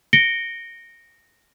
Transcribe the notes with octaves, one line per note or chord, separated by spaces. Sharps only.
A#6 C#7 D7 G7